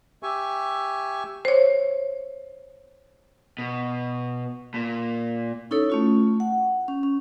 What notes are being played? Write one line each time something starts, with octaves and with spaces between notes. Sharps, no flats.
G4 E5 G#5 C#6
C5 C#5
B2
A#2
C#4 D#4 E4 A4 C#5
A3 C#4 F4
F#5
C#4
C#4